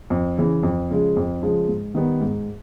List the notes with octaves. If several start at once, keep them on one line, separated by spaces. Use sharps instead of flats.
F2
C#3 E3
F2
C#3 F3 G#3
F2
C#3 F3 G#3
G#2
D#3 G3 B3
G#2